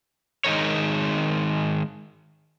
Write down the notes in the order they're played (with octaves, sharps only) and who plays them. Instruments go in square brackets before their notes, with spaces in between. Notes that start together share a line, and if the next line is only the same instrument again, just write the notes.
[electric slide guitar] D#3 G#3 D#4 A#4 C#5